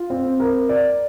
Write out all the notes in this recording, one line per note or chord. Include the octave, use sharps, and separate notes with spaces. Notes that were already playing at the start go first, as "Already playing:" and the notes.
Already playing: F4
C4
A#4
D5